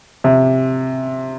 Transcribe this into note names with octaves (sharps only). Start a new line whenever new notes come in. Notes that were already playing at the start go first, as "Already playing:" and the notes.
C3